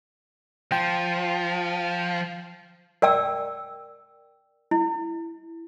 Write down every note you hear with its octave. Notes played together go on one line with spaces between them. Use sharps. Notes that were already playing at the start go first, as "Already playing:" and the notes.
F3 G5
A#4 D5 G5 E6
E4